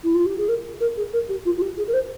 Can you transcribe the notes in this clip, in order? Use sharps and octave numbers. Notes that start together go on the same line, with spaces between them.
E4
F4
G4
G#4
A#4
A#4
G#4
A#4
G4
F4
F4
G4
G#4
A#4
C5